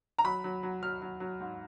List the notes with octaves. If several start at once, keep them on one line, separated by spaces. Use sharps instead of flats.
A#5
F#3 B5
F#3
F#3
F#3 F6
F#3
F#3
G#2